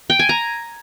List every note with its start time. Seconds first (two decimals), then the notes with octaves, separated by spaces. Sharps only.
0.10 G5
0.19 G#5
0.29 A#5